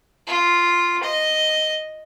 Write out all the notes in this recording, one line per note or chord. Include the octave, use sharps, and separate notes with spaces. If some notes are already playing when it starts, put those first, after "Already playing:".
F4
D#5